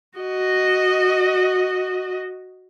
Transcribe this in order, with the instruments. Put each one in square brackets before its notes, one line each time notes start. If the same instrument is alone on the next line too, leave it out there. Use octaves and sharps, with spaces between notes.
[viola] F#4 D#5